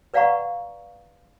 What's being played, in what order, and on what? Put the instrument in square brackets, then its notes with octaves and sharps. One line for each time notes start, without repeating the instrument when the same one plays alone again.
[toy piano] B4 D5 F5 F#5 A#5 C#6